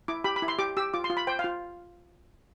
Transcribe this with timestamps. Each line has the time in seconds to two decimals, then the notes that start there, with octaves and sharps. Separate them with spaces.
0.08 E4 D6
0.24 G4 B5
0.36 B5
0.42 E4
0.48 C6
0.59 G4 D6
0.77 G4 E6
0.94 F4 D6
1.04 C6
1.10 F4
1.17 B5
1.27 C5 G5
1.39 F5
1.44 F4